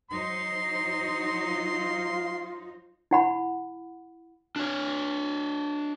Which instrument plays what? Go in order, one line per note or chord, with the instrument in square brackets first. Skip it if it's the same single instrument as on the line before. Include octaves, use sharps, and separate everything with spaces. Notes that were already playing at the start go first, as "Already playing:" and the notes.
[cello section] F#3 D#4 C5 [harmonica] C6
[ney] F4
[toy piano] E4 F#5 B5
[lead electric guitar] D4 C#5